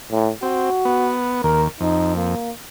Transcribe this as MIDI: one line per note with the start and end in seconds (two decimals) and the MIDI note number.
0.11 0.31 45
0.43 0.70 60
0.43 1.13 66
0.85 1.42 59
1.44 1.68 39
1.44 1.66 70
1.81 2.35 41
1.81 2.12 63
2.16 2.51 58